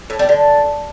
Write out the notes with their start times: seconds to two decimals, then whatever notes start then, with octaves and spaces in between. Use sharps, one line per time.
0.10 A2
0.19 G3
0.29 D3